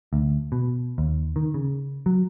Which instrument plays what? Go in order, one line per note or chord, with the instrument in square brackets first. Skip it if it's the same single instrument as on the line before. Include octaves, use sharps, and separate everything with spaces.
[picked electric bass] D2
B2
D#2
D#3
C#3
F#3